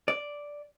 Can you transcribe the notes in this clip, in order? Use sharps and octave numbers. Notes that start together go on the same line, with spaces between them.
D5